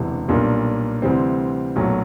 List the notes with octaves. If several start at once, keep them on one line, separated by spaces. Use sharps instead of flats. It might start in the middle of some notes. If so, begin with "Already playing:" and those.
Already playing: E1 D2 C3 E3
B1 A#2 G3 A#3 D4
D2 C3 E3 G3 C4
B1 A#2 F#3 A3 C#4